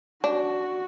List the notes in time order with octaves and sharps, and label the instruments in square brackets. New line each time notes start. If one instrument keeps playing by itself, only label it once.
[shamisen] D4 [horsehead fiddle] F#4